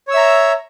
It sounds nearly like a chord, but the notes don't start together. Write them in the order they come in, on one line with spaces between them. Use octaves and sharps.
C#5 E6 E5 A#5